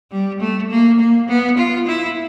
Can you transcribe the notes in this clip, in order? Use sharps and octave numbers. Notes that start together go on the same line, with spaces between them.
G3
A3
A#3
A#3
B3
F4
E4